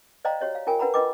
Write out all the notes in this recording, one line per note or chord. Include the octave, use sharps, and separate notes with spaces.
C5 D5 D#5 F5 G5 A#5
F#4 G4 C#5 D#5
F5
F4 A#4 G5 G#5
D4 B4 F#5 A#5 B5
D4 F4 B4 D#5 G5 D6